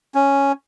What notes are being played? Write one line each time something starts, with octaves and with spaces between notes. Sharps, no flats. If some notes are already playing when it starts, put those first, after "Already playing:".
C#4